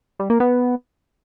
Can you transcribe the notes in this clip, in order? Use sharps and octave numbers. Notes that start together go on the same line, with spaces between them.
G3
A#3
B3